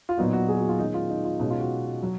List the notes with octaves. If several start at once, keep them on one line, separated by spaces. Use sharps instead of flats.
F4
A#2 F#3 B3 D#4 F#4
F#4
G#4
F#4
F4
D#3 G#3 C#4 D#4
F4
D#4
F4
B2 G#3 C#4 D#4
F4
F#4
F#3